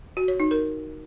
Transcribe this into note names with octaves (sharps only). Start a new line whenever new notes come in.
F#4
C#5
D#4
A#4